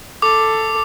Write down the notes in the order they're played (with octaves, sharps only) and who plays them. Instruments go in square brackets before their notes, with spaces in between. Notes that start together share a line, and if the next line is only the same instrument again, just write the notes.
[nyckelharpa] A4 [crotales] D6